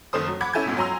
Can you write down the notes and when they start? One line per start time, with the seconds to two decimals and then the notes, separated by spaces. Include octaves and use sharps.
0.13 F#1 D#3 A4 C5 D#6
0.27 F#3
0.41 F#5 B5 D6 G#6
0.53 C#4 E4 A4 G#5 G6 G#6
0.66 C#2 G#2 B2
0.77 F#3 G#5 A#5 C6 E6